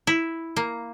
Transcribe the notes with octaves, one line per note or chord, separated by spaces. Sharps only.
E4
A#3